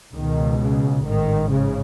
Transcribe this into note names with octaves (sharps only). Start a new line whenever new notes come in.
C#2 B2 D#3
C#3
A1 G#2 D#3
C#3